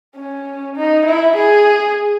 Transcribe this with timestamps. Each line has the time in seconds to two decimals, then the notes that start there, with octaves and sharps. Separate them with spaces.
0.16 C#4
0.76 D#4
1.06 E4
1.37 G#4